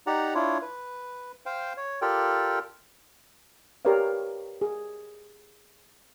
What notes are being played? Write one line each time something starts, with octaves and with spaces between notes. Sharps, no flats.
D#4 G4 D5 F#5 A#5
D4 E4 F4 C#5
B4
C5 F5 G5
C#5
F4 G4 A4 A#4 D5 G5
G4 A#4 B4 C#5 D5 F5
G#4